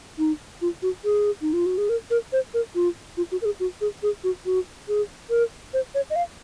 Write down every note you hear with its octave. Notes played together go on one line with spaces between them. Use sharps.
D#4
F4
F#4
G#4
D#4
F4
F#4
G#4
A#4
A#4
C5
A#4
F4
F4
F#4
A#4
G#4
F#4
G#4
G#4
F#4
F#4
G#4
A#4
C5
C#5
D#5
F5